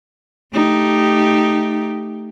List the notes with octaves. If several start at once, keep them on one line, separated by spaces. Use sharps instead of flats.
A3 D#4 G4